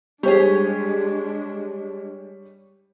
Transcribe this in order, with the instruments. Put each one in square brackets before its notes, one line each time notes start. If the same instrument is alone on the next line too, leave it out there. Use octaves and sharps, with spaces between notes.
[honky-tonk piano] G3 [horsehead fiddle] G#3 D4 [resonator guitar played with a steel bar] G4 G#4 [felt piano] C#5 C#6